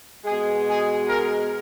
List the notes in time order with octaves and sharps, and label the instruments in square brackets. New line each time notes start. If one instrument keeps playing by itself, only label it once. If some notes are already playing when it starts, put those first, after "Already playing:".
[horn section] B2 G#3 G#4
G#4
A#4